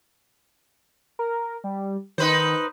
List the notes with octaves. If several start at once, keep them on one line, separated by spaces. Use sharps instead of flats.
A#4
G3
D#3 D#4 B4 C5